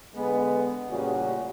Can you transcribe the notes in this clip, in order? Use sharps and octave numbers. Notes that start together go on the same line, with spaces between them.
D3 G#3 B3
A1 A#2 C#3 G3 F#4